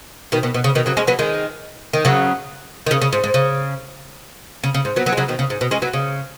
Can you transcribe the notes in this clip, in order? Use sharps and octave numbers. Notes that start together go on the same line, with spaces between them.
B2 D#3
B2
B2
C#3
B2 D#3
C#3 F#3
G#3 C#4
F#3 B3
D#3 G#3
D#3
C#3 F#3
D#3
C#3
C#3
G#2
G#2
C#3
C#3
C#3
G#2
F#3 B3
F#3 B3
G#3
C#3 F#3
B2 D#3
C#3
G#2
B2
G#3 C#4
F#3 B3
C#3